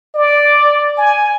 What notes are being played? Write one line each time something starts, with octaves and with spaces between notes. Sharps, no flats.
D5
G#5